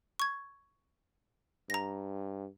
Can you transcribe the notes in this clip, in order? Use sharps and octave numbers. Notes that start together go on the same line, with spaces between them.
C#6 G#6
G2 A#5 A#6